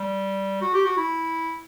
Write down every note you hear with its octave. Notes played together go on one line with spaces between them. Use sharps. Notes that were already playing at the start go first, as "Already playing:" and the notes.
Already playing: G3
F#4
G4
F#4
E4